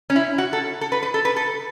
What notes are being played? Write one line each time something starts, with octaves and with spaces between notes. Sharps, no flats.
C#4
E4
F#4
A4
A4
B4
B4
A4
B4
A4